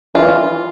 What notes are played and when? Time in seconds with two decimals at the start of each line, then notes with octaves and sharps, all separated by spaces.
0.15 E3 F4